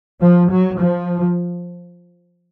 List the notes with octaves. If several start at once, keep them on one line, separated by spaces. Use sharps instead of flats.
F3
F#3
F3